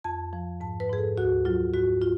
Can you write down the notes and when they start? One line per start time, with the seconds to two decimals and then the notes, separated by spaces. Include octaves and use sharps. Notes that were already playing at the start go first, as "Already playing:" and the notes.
0.04 F2 A5
0.33 F3
0.61 G#2 A5
0.80 B4
0.89 G#2 G#4
0.98 A4
1.18 D2 F#4
1.45 F#3 F4
1.74 G#2 F#4
2.02 F4